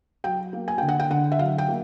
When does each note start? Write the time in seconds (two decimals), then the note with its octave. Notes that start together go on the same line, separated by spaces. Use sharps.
0.24 F#3 G5
0.53 A#3
0.68 G#5
0.78 D3 G5
0.88 F#5
1.00 G5
1.10 D3 F#5
1.32 E5
1.39 F#3 F5
1.58 G5
1.68 A#3